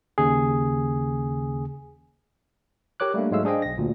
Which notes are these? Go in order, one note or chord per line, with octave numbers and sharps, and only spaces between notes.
D#2 C#3 G#4
G4 A#4 C#5 D6 F#6
G3 A3 A#3 D4
G#2 F#3 G#3 A3 F5 E6
D4 G#4 C5 D#5 G5
B1 A#6
D2 A#2